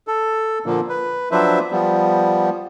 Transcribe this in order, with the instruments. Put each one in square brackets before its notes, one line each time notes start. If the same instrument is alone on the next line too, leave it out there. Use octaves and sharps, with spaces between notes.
[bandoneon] A4
A#2 D3 F3 A#3
B4
F3 F#3 D4 B4 C5 E5
F3 G3 B3